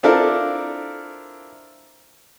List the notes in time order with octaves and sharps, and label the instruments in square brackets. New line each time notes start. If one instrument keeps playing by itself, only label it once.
[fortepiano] C4 D4 E4 F4 A4 A#4